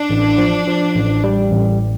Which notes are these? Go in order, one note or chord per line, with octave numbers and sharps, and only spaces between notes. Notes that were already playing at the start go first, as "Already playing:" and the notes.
Already playing: D4
A1
F3
F3
A1
G3
A1